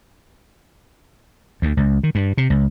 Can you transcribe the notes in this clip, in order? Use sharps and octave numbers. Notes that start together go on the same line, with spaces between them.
D2
C#2
D#3
G2
C3
C#2